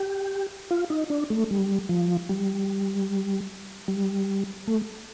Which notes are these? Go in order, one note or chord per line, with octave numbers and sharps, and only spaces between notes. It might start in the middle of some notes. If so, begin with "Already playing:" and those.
Already playing: G4
F4
D#4
D4
A3
G3
F3
G3
G3
A3